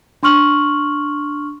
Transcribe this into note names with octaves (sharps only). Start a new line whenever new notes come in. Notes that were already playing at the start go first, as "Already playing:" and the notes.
D4 C6 C#6 F6 F#7